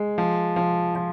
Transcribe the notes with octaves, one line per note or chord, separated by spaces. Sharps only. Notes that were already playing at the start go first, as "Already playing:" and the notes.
Already playing: G#3
F3
F3
F3